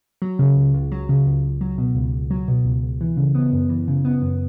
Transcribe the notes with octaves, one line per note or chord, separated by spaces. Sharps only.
F#3
C#3
C#2
C#2
F#3
C#3
C#2
C#2
F#3
B2
C#2
C#2
F#3
B2
C#2
C#2
E3
C#3
B3
F#2
E3
C#3
B3
F#2